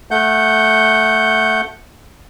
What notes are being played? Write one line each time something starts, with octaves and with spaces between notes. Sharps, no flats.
A3 F#5 G6